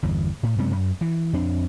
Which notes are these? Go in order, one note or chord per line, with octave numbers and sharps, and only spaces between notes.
G1 E2
A2
F#2 C3 G#3 B3
F#2
E3
F2 C4 D4